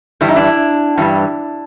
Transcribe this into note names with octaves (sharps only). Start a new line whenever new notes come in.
G2 E3 G3 E4
D#4
D4 E4
G2 E3 G3